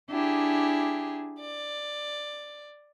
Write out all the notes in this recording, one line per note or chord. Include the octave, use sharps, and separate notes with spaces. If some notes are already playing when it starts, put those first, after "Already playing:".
D4 E4 G4 G#4
D5